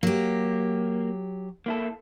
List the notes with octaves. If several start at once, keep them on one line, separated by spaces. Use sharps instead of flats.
F#3 A#3 G4
A#3 E4 A4